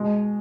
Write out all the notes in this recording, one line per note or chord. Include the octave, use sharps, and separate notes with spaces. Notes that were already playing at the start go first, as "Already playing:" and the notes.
Already playing: B2 G#3